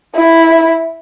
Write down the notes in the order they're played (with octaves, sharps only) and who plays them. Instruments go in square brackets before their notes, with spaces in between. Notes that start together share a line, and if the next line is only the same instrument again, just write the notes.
[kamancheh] E4